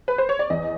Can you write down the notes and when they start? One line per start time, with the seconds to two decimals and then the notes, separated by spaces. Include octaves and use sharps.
0.08 B4
0.18 C5
0.29 C#5
0.39 D5
0.50 E2 D#5